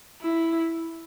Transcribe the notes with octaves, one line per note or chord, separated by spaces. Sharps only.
E4